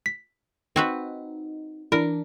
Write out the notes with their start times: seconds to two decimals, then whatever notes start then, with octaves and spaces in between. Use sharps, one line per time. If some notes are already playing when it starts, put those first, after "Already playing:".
0.06 B6
0.76 C4 D#4 F#4 B4
1.92 E3 D4 E4 A#4